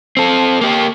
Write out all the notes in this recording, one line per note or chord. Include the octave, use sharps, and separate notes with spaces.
C4 A4
A#3 G4